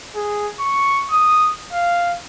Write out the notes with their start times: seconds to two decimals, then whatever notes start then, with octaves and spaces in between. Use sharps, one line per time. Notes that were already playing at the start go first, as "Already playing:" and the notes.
0.15 G#4
0.60 C#6
1.11 D#6
1.73 F5